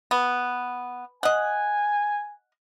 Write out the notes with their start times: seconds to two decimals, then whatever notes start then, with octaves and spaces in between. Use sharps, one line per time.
0.11 B3
1.23 D#5 F#5 G#5